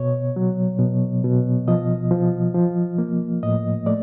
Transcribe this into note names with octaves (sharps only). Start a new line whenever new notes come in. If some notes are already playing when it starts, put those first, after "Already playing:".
Already playing: B2 C#5
F#3
B2
B2
F3 D#5
F3
F3
A#3
A2 D#5
A3 D5